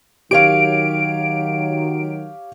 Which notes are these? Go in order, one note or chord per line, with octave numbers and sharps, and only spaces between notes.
D#3 F#3 G4 C#5 F5 D7